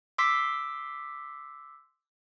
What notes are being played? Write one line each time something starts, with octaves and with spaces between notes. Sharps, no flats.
C6 D6 E6 B6 C7